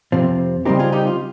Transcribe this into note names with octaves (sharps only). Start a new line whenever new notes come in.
F2 C3 F3 C4
C#3 G3 C4 D#4 G4 A#4
F4 G#4
D#4 G4
F4